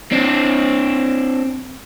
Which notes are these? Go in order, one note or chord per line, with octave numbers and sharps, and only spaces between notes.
C4 D4